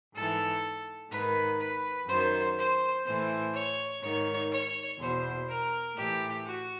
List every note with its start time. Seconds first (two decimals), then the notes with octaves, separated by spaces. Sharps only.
0.15 G#2 E3 A4
1.10 G#2 D#3 B4
1.59 B4
2.08 F#2 D#3 C5
2.57 C5
3.06 A2 E3 C5
3.53 C#5
4.02 G#2 D#3 C#5
4.51 C#5
4.99 E2 B2 C5
5.48 A#4
5.96 A2 E3 G4
6.45 F#4